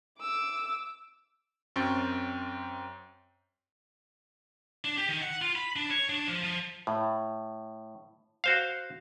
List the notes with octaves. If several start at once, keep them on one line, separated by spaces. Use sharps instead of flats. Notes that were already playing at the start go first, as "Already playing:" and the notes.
D6 E6
F#2 C4 G5 C#6 A6
D4
G4
D#3
F#5
F4
B5
D4
C#5
D4
F3
F3
A2
F#4 C5 F5